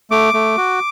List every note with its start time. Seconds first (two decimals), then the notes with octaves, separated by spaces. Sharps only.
0.11 A3 D6
0.34 A3
0.57 F#4